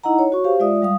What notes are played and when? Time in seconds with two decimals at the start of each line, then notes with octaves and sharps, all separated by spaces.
0.04 D#4 E4 D#5 F#5 A#5
0.19 C#5
0.32 F#4 C#5 C#6
0.44 G4 C5 F5
0.60 G#3 F4 D5 E5 D#6
0.82 G3 F5 D#6